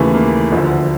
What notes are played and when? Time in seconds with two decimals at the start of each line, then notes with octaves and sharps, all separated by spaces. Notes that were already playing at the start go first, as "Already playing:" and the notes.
Already playing: D#2 C#3 E3 A3
0.15 A#3
0.52 D2 D3 F3